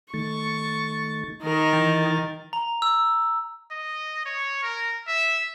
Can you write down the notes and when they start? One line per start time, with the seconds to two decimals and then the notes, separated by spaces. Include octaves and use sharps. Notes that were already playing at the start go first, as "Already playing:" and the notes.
0.14 D#3 A3 C#6 A6
1.43 D#3 A#4
1.73 E3 G5 A6
2.53 A#5
2.82 E6
3.71 D#5
4.25 C#5
4.63 A#4
5.07 E5